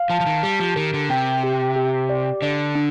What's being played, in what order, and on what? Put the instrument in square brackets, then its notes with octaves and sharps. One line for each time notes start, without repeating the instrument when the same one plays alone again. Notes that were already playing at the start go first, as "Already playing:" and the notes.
Already playing: [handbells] F5
[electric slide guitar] F3 [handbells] A5
[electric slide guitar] F3
D#3
[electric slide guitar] G3 [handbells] G4
[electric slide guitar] F3
[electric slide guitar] D#3 [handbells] A#4
[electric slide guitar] D3
[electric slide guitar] C3 [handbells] G5
[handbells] G4
G4
D5
[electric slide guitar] D3 [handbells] D5
[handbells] D4